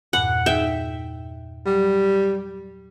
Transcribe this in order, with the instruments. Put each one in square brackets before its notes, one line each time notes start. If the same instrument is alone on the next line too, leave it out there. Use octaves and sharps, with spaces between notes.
[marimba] E2 G2 A#2 [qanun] F#5
[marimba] D#4 G#4 [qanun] E5 G5
[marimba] F#3 [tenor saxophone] G3